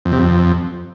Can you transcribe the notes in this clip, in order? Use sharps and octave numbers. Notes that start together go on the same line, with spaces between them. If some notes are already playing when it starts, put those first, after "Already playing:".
F2
C3
F2